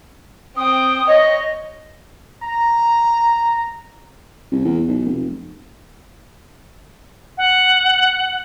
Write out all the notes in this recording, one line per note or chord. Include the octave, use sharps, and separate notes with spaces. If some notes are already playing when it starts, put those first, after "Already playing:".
C4 G5 D#6
C#5 D#5
A#5
C2
E2
B1
F1
F#5